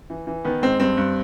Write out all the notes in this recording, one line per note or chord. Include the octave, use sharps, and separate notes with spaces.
E3
E3
D#3 B3
G#2 C4
G2 C4
G2